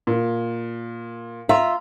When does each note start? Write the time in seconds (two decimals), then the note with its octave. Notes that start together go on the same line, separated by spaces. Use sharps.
0.07 A#2
1.49 F4 E5 A#5